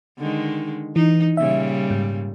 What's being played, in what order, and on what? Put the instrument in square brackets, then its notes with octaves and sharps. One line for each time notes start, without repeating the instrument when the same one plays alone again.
[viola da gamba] D3 D#3 G#3
[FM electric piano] E3 [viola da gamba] D#4
[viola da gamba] A#2 C#3 G3 [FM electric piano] E5
[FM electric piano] G#2